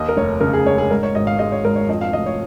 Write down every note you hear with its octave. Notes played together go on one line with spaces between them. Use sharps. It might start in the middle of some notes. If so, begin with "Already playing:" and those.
Already playing: D#2 D#5
A#4
F1 C#5
C#3 A#4
G#4
G#3 C#5
G#4
G#2 A#4
C#5
G#1 D#5
F5
G#3 D#5
C#5
G#1 A#4
C#5
F2 D#5
F5
F1 D#5
C#5